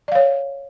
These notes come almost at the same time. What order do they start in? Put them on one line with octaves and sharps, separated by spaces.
D5 F5 C#5